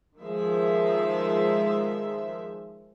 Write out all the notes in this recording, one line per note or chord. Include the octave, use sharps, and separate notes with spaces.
D#3 F3 G#3 E5